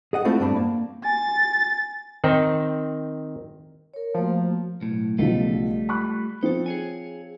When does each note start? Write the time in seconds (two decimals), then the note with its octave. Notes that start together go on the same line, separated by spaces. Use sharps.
0.13 G#4 D#5 F#5
0.24 G#3 A3 C4 E4 F4 A4
0.40 G2 C4 D4 B5
0.56 A#3
1.05 G#5 A6
2.24 D#3 C4 D#4
3.94 A#4 C#5
4.14 F3 A3 A#3 F#4
4.81 B1 A2
5.18 B1 C#3 F3 G3 A3 F4
5.89 B5 C#6 F#6
6.43 F3 C4 D#4 A4
6.66 G#4 C#5 G#5